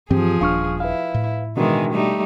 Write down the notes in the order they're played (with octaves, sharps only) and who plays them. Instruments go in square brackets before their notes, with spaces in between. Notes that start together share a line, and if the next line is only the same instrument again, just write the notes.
[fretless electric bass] G2 E3 C4 [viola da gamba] F3 G#4 [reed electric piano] G4
[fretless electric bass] D#1 D4 [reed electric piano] F5 C#6 F6
[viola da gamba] E4 [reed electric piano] B4 F5
[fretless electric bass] A2
[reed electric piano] B2 D4 F#4 [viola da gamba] D#3 E3 G#3
[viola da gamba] G3 A3 D#4